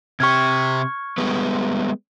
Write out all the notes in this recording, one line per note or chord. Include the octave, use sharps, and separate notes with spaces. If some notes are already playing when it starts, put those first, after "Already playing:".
C3 G4 C#6 F6 G#6
G3 G#3 B3